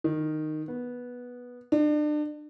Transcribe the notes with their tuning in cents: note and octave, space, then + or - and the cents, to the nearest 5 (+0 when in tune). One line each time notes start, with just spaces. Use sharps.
D#3 -10
B3 -10
D4 +35